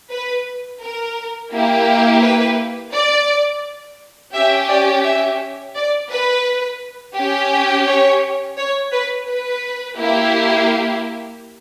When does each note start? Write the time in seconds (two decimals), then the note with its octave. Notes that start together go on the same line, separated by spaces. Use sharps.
0.11 B4
0.81 A#4
1.52 A#3 E4 G4
2.22 B4
2.93 D5
4.34 C#4 G4 E5
4.69 D5
5.05 E5
5.75 D5
6.11 B4
7.16 C#4 G4
7.87 C#5
8.58 C#5
8.93 B4
9.28 B4
9.99 A#3 E4 G4